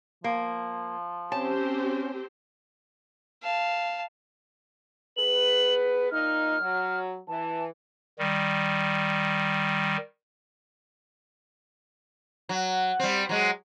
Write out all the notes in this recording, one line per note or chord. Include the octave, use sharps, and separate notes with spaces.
F3 A#3
C4 C#4 G4 C5 A5
F5 A5
B3 G#4 B4 F#7
A#2 D#4 F6
F#3
E3 A5
D#3 G3
F#3
G3 C4
F#3 G#3